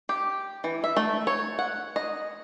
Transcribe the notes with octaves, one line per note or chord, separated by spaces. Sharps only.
G4
E3
E5
A3
C#5
F#5
D#5